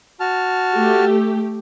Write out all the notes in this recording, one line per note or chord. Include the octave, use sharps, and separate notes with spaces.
F#4 A5 F6
A3 G4